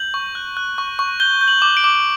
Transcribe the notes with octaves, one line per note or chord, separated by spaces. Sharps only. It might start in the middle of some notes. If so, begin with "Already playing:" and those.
Already playing: G6 F#7
C#6
F#6
F#6
C#6
C#6
G6 G7
G6
F#7
D6
D7
D6